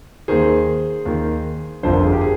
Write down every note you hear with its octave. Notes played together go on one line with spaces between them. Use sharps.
D#2 D#3 G#4 C5
D#2 D#3
G1 F2 D3 C5
A#4
G#4
G4 A#4
G#4